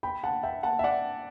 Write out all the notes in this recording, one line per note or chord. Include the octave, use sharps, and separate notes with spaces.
G5 B5
F#5 A5
E5 G5
F#5 A5
E5
D5 F#5